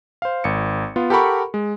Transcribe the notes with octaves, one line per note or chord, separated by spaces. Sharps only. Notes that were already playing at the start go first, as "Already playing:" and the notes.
C5 F5
G#1 C#7
B3 F4
G4 A4 A#4 F#5 B5 C#6
G#3